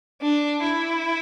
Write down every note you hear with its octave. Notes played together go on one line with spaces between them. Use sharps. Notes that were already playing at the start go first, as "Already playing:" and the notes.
D4
E4